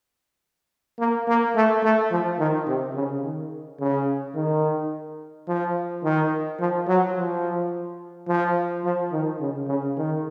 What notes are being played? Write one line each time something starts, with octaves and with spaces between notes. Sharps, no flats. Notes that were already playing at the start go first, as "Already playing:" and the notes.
A#3
A#3
A3
A3
F3
D#3
C3
C#3
D#3
C#3
D#3
F3
D#3
F3
F#3
F3
F3
F3
D#3
C#3
C#3
D#3